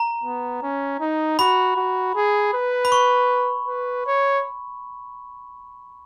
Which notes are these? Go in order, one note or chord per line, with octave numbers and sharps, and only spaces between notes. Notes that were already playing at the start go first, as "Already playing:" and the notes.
Already playing: A#5
B3
C#4
D#4
F#4 B5
F#4
G#4
B4
B5
C#6
B4
C#5